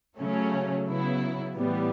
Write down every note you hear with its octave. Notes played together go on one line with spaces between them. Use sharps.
C#3 F#3 A3 C#4
C#3 F#3 B3 E4
A2 E3 G3 B3